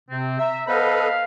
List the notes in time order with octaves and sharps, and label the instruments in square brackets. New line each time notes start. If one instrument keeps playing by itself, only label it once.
[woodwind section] C3 C4
[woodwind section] E5 [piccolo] A#5
[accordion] B3 A4 B4 [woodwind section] C5 D#5 B5 [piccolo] F5